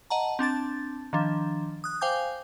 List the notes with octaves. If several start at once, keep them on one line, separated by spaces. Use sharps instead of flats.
D#5 F#5 A5 A#5
C4 D4 A5 A6
D#3 F3 D4
D#6 F#6
C5 F5 G5 G#5 D6 G6